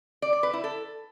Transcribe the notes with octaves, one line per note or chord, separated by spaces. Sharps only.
D5
D5
B4
E4
A4